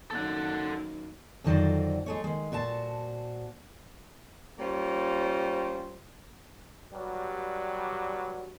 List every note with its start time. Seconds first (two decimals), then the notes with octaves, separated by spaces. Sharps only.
0.11 F#2 D#3 A#3 A4 F#5
1.44 F2 D3 D#3 F#3 C5 D5
2.06 G#3 A3 C#5
2.24 D#3 G#3
2.52 A#2 F#4 C5 A5
4.59 G3 A#3 C#4 F4 C5 C#5
6.93 G2 F#3 G3